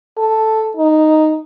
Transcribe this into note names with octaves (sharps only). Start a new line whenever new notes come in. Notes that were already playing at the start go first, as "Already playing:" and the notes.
A4
D#4